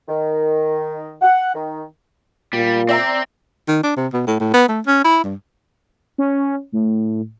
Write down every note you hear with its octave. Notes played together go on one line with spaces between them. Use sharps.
D#3
F#5
D#3
A#2 G3
C4 D5 E5 A#5
D#3
D4
C3
B2
A2
A2
B3
A3
C#4
E4
G2
C#4
A2